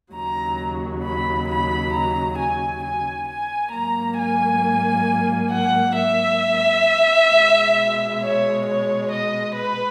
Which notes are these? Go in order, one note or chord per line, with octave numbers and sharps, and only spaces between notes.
D#2 C#3 F#3 A#5
B5
B5
A#5
G#5
G#5
G#5
G#2 F#3 A#3 A#5
G#5
F#5
E5
B2 G#3
C#5
C#5
D#5
B4